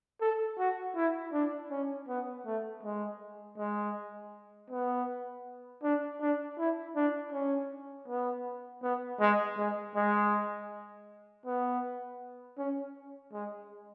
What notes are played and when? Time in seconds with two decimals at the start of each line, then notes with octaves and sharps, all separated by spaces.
0.21 A4
0.58 F#4
0.96 E4
1.33 D4
1.71 C#4
2.08 B3
2.46 A3
2.83 G#3
3.58 G#3
4.70 B3
5.83 D4
6.21 D4
6.58 E4
6.96 D4
7.33 C#4
8.08 B3
8.83 B3
9.20 G#3
9.58 G#3
9.96 G#3
11.46 B3
12.58 C#4
13.33 G#3